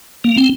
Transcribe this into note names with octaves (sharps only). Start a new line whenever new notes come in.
A#3
C4